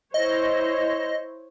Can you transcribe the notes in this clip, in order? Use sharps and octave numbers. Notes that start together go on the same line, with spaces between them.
E4 C5 C#5 D#5